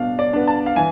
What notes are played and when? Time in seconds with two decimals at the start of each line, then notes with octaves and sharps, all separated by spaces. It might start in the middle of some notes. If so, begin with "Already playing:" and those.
Already playing: B2 B3 D4 F5
0.19 D5
0.33 B3 D4
0.48 A5
0.66 F5
0.76 E3 G#5